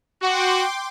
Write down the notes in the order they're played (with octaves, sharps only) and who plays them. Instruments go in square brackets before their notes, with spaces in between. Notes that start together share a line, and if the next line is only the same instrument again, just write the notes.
[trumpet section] F#4 [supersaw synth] G5 C6 D6